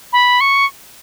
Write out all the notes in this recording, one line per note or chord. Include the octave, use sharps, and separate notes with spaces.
B5
C#6